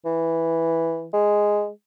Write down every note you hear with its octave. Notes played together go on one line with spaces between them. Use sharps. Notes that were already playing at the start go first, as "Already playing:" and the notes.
E3
G#3